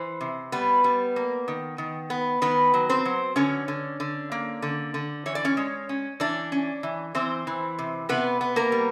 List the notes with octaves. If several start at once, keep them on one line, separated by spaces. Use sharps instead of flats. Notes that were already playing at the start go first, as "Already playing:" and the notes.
Already playing: E3 C5
C3
G3 B3 B4
G3
A#3
D#3
D#3
B3
D#3 B3 B4
F#3
C4 C5
F#3
D3 C#4 C#5
D3
D3
A#3
D3
D3
E3 C#5
D5
C#4 C#5
G#3
C#4
E3 D4 D5
C#4
E3
E3 C4 C5
E3
C3
C3 B3 B4
B3
A#3 A#4
G3